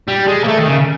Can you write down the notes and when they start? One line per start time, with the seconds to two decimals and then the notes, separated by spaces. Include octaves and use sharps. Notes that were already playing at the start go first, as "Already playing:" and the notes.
0.08 G3
0.28 G#3
0.44 A#3
0.48 A3
0.58 D#3
0.68 C#3